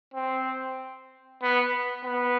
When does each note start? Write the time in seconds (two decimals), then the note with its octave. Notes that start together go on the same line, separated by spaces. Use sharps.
0.14 C4
1.42 B3
2.05 B3